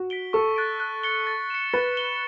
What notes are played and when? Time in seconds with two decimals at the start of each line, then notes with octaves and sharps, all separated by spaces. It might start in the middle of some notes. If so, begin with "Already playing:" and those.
Already playing: F#4
0.10 B6 D7 G7
0.33 A4 C#6
0.56 F#6 A6 D7
0.80 F#6
1.03 A6 C#7 G7
1.27 A6
1.50 C#7 E7
1.74 B4 A6
1.97 E7 G7